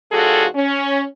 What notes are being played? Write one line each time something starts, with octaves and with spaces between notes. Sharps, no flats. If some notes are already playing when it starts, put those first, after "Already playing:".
D#2 G3 F4 F#4 G#4 A4
C#4